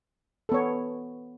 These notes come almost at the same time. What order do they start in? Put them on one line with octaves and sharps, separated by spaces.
A4 B3 C#5